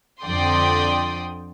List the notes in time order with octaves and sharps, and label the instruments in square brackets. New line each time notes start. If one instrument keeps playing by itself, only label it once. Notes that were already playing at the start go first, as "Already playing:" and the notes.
[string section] F2 D3 D5 G5 C6 D#6